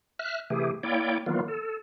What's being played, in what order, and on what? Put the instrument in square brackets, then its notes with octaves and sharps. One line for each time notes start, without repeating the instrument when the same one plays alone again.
[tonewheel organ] E5 F6 F#6
C3 E3 A3 G4 G#4
A#3 E4 C#5 D5 G5
D#3 E3 F#3 A#3 B3 F4
A4